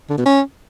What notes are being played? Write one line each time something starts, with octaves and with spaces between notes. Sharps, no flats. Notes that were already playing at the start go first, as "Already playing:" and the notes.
D3
B2
C#4